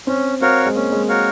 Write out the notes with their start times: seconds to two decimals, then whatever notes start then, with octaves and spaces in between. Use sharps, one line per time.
0.07 C4 C#4
0.41 C4 F#4 A#4 C#5 F5
0.66 G#3
0.75 A#3 C#4
0.92 G#3
1.08 F#4 A#4 C#5 F5